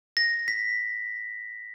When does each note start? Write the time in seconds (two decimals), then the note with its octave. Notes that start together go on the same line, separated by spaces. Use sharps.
0.17 A#6
0.48 B6